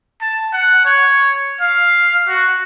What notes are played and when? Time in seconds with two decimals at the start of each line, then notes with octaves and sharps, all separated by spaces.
0.21 A5
0.53 F#5
0.85 C#5
1.61 F5
2.27 F#4